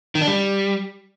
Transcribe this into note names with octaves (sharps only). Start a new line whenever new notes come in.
D#3
D4
G3